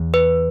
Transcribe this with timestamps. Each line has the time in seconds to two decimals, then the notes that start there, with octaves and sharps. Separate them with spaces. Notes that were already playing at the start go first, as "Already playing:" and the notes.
Already playing: E2
0.14 B4